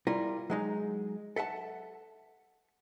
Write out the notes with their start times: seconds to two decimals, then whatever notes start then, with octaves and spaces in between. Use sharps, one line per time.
0.07 G3 E4 F4 A#4
0.50 F#3 G#3 D#4
1.36 A4 E5 F#5 A5